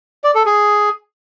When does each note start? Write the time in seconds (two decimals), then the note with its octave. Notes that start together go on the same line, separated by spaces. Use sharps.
0.24 D5
0.35 A4
0.46 G#4